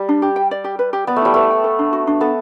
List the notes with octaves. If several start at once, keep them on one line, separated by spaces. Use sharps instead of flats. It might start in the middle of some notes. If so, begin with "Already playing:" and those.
Already playing: G3
D4
G4
G5
D5
G4
B4
G4
B3 D5
A3
G3 E4
A3 B4
G5
A4
D4
F#4
D4
B3 A4